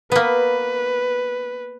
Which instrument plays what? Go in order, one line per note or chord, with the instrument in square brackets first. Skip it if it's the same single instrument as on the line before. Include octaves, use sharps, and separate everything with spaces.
[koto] A#3 B3 [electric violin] B4